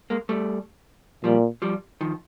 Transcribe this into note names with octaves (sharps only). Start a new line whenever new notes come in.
G#3 A#3
G3 A3
A#2 F3 G3
F3 G3
D#3 F3